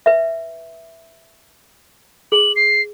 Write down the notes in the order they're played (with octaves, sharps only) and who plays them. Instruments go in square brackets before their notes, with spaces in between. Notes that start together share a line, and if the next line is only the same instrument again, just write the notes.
[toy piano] B4 E5
[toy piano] G#4 [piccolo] F#7
[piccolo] C7